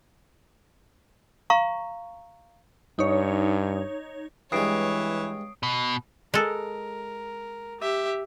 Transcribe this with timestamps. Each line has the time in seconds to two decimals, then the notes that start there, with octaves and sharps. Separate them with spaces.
1.50 F5 A#5 C#6
2.99 G2 D#4 C#5
4.52 G2 E3 G#3 C#5 D#6 C7 D7
5.63 B2
6.34 G#3 A4 A#4
7.80 G4 E5